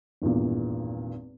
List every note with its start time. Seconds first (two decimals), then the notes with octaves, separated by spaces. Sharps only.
0.22 G#1 E2 G2 A#2